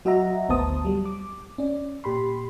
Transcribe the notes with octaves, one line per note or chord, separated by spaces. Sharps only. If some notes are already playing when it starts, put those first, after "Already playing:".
F#3 F#4 D#5 E5 F#5 A#5
G#1 D2 B3 C5 A5 D#6
F#3 G3
D6
C#4 D5
A#2 G4 B5 C6